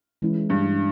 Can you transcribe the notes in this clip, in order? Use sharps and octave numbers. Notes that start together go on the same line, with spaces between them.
E3 G#3 C#4 E4
G2